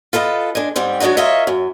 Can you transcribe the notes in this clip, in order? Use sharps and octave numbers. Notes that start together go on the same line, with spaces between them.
F4 A4 B4 D#5
G#3 D4
G#2 G3 C4
F#3 G#3 D4 D#4 F#4
F4 A#4 C#5 D#5 E5
F#2